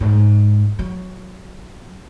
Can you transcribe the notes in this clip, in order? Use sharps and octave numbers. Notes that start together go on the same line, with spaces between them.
G#2
F#3